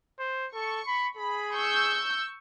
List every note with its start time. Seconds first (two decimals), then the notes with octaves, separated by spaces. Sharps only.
0.19 C5
0.54 A4 C#6
0.87 B5
1.17 G#4 B5
1.55 C#6 E6 G6